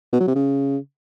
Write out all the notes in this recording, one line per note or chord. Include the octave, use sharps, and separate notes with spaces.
B2
F#3
C3
C#3